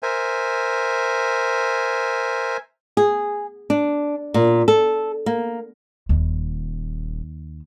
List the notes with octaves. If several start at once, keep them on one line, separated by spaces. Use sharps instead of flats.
A#4 C5 E5 G#5
G#4
D4
A#2
A4
A#3
D#1 D#2